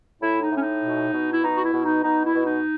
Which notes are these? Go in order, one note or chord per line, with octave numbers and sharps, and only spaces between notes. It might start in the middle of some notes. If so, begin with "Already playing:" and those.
A2 E4
D#4
A2 C#4
D#4
B2
B2
E4
B2 D#4
F#4
E4
B2
D#4
B2 D#4
E4
B2
D#4